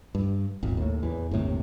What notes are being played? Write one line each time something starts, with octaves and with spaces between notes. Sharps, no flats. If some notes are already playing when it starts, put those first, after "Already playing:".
G2
D#1 G#1
D#2 A2
E2 E3
G1 D#2 A2 C3